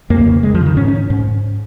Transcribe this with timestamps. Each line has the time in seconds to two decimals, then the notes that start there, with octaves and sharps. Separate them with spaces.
0.10 F2 A#3
0.26 C#3
0.43 F2 G#3
0.55 F3
0.61 C#3
0.66 D#3
0.76 G#2 C#4
0.88 C#4
1.10 G#2